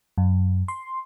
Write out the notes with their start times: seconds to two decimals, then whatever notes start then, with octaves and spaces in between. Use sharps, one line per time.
0.18 F#2
0.68 C6